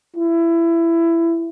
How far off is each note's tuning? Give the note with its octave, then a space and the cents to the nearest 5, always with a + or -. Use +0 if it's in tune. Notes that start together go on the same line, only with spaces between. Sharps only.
E4 +20